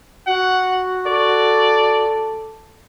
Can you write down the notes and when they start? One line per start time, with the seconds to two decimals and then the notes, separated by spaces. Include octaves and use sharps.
0.27 F#4 F#5
1.07 A4 D5